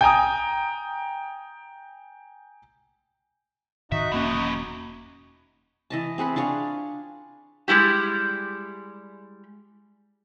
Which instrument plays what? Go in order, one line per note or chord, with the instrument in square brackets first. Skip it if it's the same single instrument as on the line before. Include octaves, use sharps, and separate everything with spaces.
[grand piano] G5 G#5 A#5 D#6
[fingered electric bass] G#2 D#3 [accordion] D#4 F#4 [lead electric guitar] E5
[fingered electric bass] E1 A#3 C#4 [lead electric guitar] E3 F#3
[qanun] E3 D#5 A5
C4 G#4 F#5 B5
D4 F4 G#4 C#5
[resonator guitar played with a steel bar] G3 G#3 E4 G4